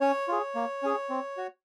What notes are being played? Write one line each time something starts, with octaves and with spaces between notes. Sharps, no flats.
C#4 C#5
F4 G#4
A#3
C#4 G#4
C4
F#4